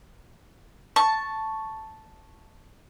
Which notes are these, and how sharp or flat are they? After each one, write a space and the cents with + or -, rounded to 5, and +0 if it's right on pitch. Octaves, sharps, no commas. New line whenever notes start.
A5 +0 C#6 +0